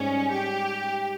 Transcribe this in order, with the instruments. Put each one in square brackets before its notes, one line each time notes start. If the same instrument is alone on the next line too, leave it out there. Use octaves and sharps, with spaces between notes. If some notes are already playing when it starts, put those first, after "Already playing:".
Already playing: [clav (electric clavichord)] G#2 G3 [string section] C#4
[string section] G4